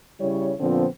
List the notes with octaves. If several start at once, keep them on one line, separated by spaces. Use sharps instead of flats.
C#3 G3 E4 C#5
A#2 D3 F3 B3 C4